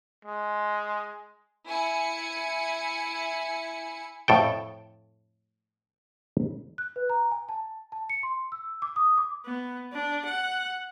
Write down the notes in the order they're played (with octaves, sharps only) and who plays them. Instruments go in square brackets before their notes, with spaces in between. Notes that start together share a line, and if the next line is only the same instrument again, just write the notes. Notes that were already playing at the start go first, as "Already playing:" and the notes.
[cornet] G#3
[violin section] E4 G#5 C#7
[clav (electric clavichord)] F2 A2 A4 G5
[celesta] F#6
B4
A#5
G#5
A5
A5
C#7
C6
E6
D6
D#6
D6
[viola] B3
D4
F#5